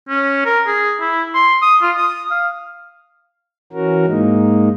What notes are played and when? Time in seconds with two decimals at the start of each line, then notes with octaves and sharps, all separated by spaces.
0.09 C#4
0.45 A#4
0.67 G#4
1.00 E4
1.35 C6
1.62 D#6
1.82 F4
1.96 D#6
2.31 F5
3.73 E3 C#4 F#4 A#4
4.06 G#2 G#3 A#3 D#4